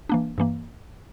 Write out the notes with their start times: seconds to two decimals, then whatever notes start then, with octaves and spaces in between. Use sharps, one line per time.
0.09 E3 A#3 D4
0.38 G2 E3 A#3